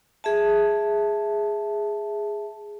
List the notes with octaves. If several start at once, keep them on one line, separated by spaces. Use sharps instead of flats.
G#4 E5 A5